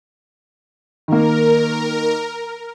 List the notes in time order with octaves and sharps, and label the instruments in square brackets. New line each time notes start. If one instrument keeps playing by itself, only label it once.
[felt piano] D#3 A#3 [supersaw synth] A#4